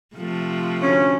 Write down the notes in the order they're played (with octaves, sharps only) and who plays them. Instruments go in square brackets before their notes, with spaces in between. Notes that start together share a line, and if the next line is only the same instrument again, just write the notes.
[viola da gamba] C3 F3 A3
[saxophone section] D2 C#4